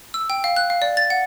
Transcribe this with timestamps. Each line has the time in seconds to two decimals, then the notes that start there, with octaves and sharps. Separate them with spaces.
0.14 E6
0.30 G5
0.44 F5
0.56 F#6
0.70 F5
0.82 D5
0.97 A6
1.10 F#5